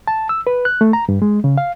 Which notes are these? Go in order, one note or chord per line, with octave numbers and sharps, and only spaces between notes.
A5
E6
B4
F#6
A3
A#5
G2
G#3
C#3
F5